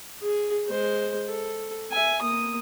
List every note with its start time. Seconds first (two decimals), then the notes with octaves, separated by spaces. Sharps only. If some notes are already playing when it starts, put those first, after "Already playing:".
0.22 G#4
0.68 G#3 C5
1.28 A4
1.92 E5 G#5
2.22 A#3 D#6